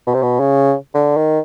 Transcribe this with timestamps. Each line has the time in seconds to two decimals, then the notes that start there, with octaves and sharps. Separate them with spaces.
0.07 B2
0.14 C3
0.22 B2
0.40 C#3
0.94 D3
1.17 D#3